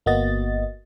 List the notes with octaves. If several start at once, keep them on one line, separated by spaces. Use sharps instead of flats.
G1 A#3 B3 F#4 D#5 A6